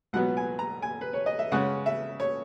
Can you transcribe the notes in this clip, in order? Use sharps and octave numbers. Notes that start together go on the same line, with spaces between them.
C#2 B2 F#3 B3 F#5
G#5
A#5
G#5
B4
C#5
D#5
E5
C#3 G#3 C#4 F#5
E5
C#5